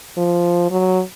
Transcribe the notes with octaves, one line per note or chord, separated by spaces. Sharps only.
F3
F#3